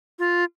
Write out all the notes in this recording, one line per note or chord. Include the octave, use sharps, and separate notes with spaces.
F4